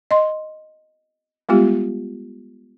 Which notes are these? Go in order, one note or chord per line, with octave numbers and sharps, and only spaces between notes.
D#5 C6
G3 G#3 B3 F4 G4